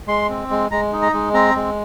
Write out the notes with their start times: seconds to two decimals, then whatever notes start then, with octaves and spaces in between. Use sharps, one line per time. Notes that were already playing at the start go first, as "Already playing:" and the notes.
0.08 G#3 C6
0.29 C4
0.51 G#3
0.71 G#3 A#5
0.93 D#4
1.02 A#5
1.14 G#3
1.33 C4 A#5
1.55 G#3